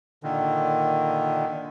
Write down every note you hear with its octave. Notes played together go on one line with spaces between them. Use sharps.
A#2 D3 D#3